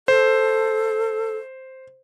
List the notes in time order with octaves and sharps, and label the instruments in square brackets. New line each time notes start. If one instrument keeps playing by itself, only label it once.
[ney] A4 [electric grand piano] C5